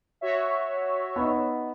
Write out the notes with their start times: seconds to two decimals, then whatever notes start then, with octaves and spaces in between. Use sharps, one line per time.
0.21 F#4 C#5 E5
1.16 B3 D#4